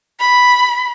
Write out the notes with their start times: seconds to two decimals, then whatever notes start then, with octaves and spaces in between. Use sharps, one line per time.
0.19 B5